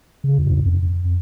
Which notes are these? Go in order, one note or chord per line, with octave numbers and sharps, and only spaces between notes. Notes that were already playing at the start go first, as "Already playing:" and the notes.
C#3
E2
G2
F2
F2